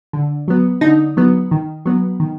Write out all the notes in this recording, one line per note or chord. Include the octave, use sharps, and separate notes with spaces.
D3
F#3 B3
D3 D#4
F#3 B3
D#3
F#3 B3
D#3